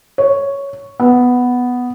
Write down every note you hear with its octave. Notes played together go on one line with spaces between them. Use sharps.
C#5
B3